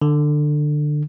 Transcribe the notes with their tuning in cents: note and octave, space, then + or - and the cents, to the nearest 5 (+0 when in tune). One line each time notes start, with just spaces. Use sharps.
D3 +20